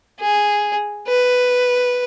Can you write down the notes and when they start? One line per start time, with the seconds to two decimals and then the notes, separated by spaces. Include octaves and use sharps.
0.20 G#4
1.08 B4